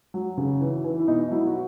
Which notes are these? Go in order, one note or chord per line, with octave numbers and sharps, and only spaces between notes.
F#3
C#3
E3
E3
E4
B2 D#4
F#3 E4
F#4